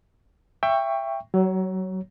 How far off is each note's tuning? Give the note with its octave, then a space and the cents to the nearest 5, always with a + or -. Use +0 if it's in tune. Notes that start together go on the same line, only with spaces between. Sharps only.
E5 +20 G5 +15 C#6 +0
F#3 +30 C#5 +0